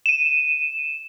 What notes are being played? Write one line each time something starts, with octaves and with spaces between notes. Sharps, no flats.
D#7 E7